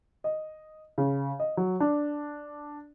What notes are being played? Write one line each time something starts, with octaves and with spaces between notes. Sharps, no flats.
D#5
C#3
D#5
F#3
D4